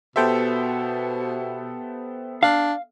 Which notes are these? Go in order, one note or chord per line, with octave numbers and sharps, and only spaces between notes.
B2 B3 G4 A4 C5 E5 G5
D4 F5